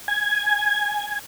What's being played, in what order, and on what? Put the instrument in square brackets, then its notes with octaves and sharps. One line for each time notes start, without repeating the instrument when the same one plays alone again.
[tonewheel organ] G#5 G#6